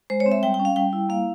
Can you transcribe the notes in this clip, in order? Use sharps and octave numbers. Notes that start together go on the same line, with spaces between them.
G#3 C5
C#5
C4
E5
G3 G5
G5
C#4
F5
G3 G5
E4
A#3 F5